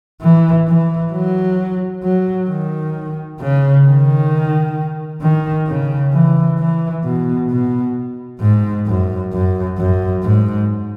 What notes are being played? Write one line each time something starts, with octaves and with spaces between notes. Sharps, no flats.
E3
E3
F#3
F#3
D#3
C#3
D#3
D#3
C#3
E3
E3
B2
B2
G#2
F#2
F#2
F#2
G#2